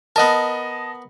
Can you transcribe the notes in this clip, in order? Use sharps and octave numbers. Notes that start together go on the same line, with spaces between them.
B3 A#4 D#5 A5